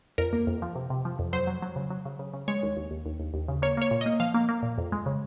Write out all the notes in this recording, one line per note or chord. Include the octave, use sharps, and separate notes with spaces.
F2 A#4
A#3
F2
F3
C3
C3
F3
F2
F#3 C5
F#3
F#3
C#3
F#3
C#3
C#3
C#3
G#3 C#5
D#2
D#2
D#2
D#2
D#2
D#2
C#3
A#3 C#5
A#3 C#5
A#2
A#3 D#5
F3 F5
A#3
A#3
A#2
F2
G#3
C#3